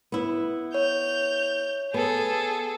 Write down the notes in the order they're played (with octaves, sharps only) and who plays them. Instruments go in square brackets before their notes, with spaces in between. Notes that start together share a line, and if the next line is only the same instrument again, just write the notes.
[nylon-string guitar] B3 E4
[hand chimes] C#5 [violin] G6 F7
[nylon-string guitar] B3 [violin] G#4 A4